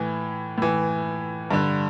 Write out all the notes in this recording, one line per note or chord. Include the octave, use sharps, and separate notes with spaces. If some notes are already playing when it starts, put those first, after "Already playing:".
Already playing: A2 E3
A2 E3
G2 D3